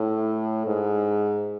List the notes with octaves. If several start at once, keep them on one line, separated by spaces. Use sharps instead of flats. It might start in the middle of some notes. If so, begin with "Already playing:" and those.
Already playing: A2
G#2